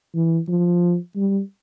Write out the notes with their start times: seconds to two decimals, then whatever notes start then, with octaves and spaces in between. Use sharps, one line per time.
0.15 E3
0.48 F3
1.16 G3